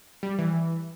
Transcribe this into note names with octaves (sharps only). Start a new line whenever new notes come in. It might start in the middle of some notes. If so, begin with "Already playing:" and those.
G3
E3